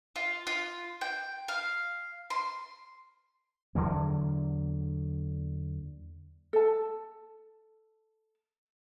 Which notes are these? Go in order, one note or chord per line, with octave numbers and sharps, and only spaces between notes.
F4
F4
G5
F5
C6
E2 D3 F#3 A#3
A4 A5